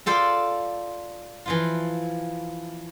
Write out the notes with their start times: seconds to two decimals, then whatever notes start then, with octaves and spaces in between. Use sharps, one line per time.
0.06 F4 A4 C5 D5
1.46 E3 F3 F4